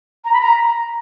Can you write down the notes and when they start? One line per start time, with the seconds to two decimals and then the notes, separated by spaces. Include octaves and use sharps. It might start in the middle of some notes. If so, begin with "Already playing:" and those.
0.25 A#5
0.33 B5
0.41 A#5